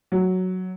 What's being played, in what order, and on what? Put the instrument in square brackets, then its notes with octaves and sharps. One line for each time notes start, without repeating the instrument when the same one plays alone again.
[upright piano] F#3